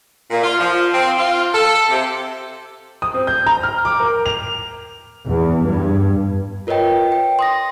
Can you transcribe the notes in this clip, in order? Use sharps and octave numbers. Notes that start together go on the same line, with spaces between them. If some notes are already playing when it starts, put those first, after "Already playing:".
A#2
F4
F3
C4
F4
A4
C3
D#6
C4
G6
A#5
F6
D6
A#4
F7
E2
G2
F4 A#4 B4 C#5 D#5 G5
G5
C6 D#6 A#6